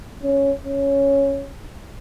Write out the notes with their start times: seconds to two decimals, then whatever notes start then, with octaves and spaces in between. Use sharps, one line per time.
0.24 C#4
0.65 C#4